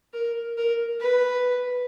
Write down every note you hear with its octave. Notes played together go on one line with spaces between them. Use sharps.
A#4
A#4
B4